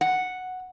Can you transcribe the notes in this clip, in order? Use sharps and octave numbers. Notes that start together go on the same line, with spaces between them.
F#5